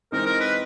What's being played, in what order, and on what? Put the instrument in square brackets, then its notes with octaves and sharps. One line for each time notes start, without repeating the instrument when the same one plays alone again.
[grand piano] E3 G#3 C4 D#4 [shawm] A#4
[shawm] A#4
B4